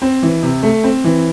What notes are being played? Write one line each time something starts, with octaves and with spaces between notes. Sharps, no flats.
C4
E3
C3
A3
C4
E3